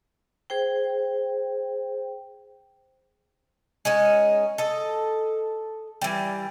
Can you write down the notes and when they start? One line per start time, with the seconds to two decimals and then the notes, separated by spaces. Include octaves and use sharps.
0.50 G#4 C5 G5
3.85 G#3 C#4 D#4
4.58 A4 D#5
6.02 E3 G3